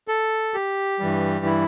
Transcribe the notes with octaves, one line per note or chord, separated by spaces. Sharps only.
A4
G4
G2 E3 G3
E4